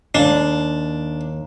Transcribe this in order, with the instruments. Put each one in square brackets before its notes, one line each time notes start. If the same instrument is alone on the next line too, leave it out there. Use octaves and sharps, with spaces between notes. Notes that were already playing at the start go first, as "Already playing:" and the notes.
[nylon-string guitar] D#2 [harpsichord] D4